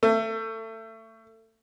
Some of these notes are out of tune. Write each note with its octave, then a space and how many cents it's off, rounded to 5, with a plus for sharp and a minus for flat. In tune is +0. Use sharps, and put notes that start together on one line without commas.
A3 +25